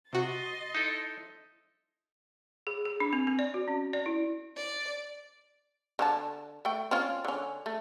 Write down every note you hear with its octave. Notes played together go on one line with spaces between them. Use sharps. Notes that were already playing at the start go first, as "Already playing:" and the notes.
C3 F#4 D#5 C6 A6
D#4 E4 A4
G#4
G#4
D4
C4
C4
D5
F#4
C#4
D5
E4
D5
D3 C#4 A5
A3 G5
C4 C#4 F4
D3 C#4
A3